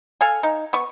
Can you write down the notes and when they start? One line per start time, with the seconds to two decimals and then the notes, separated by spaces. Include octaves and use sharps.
0.21 A4 F5 G#5
0.43 D#4
0.73 B3 C#6